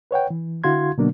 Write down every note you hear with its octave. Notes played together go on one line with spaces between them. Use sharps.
B4 C#5 F#5 G5
E3
D3 E4 F#4 F5 C6 G#6
B2 D3 F#3 A#3 B3 D4